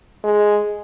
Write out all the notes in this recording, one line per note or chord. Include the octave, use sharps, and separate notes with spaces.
G#3